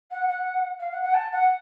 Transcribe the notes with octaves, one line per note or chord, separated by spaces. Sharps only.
F#5
F#5
F5
F#5
F#5
A5
F#5